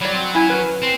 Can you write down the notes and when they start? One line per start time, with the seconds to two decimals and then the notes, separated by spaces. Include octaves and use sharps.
0.01 F#3 G3 D5
0.14 C4
0.33 C#4 E4 G#5
0.46 C#4 B4
0.82 C4